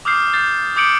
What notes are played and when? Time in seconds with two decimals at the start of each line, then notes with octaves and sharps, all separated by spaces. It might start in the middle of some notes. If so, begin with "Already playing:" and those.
0.05 D6 D#6 F6 G6 C7
0.33 G6 A6 C7
0.76 D6 D#6 G6 C#7 D7 F#7